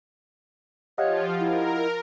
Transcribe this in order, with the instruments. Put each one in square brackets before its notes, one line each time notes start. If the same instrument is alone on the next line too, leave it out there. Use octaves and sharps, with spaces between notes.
[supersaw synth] F3 F4 [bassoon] G4 [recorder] C#5 [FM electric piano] D#5 F5 F#5
[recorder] E4 [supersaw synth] A#4